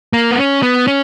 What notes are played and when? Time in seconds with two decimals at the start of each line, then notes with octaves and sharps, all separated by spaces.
0.13 A#3
0.31 B3
0.39 C#4
0.63 B3
0.87 C#4